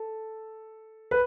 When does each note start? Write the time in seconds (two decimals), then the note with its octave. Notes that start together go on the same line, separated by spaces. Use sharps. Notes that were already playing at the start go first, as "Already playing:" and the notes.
Already playing: A4
1.11 B4